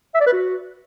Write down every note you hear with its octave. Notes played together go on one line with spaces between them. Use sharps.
E5
D5
B4
F#4